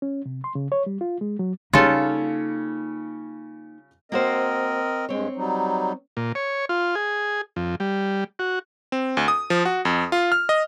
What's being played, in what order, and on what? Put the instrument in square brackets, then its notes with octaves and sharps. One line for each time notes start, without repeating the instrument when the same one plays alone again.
[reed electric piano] C#4
C3
C6
C#3
C#5
G3
F4
G#3
F#3
[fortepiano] C#3 G3 C#5 [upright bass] A#3 D#4 [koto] F4 A4
[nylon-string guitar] A#3 F#4 C5 [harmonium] C4 A#4 D#5
[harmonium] G2 G#3 [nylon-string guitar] C4 C#5
[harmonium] F#3 G3 D#4
[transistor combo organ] A#2
C#5
F4
G#4
F2
G3
F#4
[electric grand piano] C4
D2
D#6
F3
F#4
F2
F4
F6
D#5